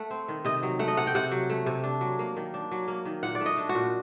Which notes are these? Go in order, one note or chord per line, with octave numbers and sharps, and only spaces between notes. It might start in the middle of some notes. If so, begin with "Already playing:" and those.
Already playing: A3 F#5
C4
D#3
C3 D#5
F#3
A3 F#5
D#5
C3 F#5
G5
C3 F#5
F#3
A3
C3
D4
F#3
A#3
D#3
D4
F#3
A#3
D#3
A#2 F#5
D5
A3
D#5
D4
F#4
A#2